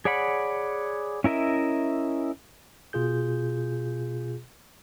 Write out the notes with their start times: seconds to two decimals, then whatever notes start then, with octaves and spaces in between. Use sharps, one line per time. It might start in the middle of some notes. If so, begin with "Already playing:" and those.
0.05 G#4 C#5 D5 F#5 B5
1.24 C#4 E4 A#4 D#5 E5
2.93 B2 F4 G#4 G6